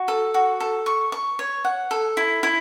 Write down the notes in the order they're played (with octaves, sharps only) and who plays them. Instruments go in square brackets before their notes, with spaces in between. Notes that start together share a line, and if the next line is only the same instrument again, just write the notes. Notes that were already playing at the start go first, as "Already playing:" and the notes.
Already playing: [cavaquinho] F#4
A4
F#4
A4
C#6
C#6
C#5
F#5
A4
E4
E4